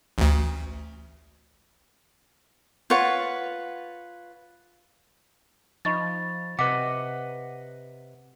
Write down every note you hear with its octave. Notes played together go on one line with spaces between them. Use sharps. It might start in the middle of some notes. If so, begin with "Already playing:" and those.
A1 D2
F4 B4 C#5 F#5
F3 D#4 D#5 B5 C#6 A6
C3 B4 D#5 F#5 D6 B6